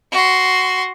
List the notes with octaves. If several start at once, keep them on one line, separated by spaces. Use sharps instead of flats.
F#4 C6